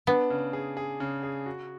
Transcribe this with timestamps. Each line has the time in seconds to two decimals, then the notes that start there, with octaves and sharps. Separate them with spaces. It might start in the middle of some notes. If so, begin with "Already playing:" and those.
0.07 B3 D4
0.30 C#3
0.53 G#4
0.77 G#4
1.00 C#3
1.23 G#4
1.46 F#4